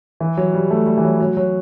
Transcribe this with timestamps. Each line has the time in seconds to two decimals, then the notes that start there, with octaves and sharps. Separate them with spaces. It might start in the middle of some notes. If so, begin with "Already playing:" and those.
0.20 E3
0.37 F#3
0.53 G3
0.70 A3
0.86 G3
0.97 E3
1.04 F#3
1.20 F#3
1.37 F#3